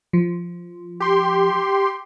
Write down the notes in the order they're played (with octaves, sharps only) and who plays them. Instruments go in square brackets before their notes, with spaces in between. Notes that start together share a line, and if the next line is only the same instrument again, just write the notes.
[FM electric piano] F3
[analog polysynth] G4 C6